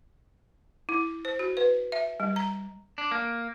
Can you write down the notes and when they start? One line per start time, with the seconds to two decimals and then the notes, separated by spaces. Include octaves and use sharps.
0.89 E4
1.25 C5
1.39 F#4
1.57 B4
1.92 E5
2.20 G3
2.36 A#5
2.98 D4
3.11 A#3